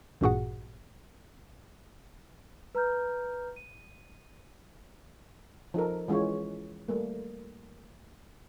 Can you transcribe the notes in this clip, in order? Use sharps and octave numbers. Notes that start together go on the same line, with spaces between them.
A1 G2 A#2 F#4 G#4 F#5
B4 A#5 F6 G6
D#7
F3 D#4 A4 A#4
E3 G#3 C#4 F4 C#5
G3 A3 A#3